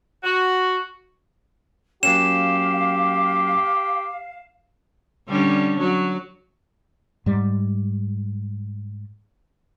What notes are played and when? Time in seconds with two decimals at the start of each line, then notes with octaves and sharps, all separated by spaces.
0.24 F#4
2.03 F#3 A#3 C#4 G4 F5 E7
5.28 D3 G3 C#4
5.80 F#3
7.26 G#2 G3